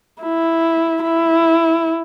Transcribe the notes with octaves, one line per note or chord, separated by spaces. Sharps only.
E4
E4